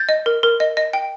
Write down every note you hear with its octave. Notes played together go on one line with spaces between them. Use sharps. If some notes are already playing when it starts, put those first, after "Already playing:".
Already playing: G6 A6
D#5
A#4
A#4
D#5
D#5
G5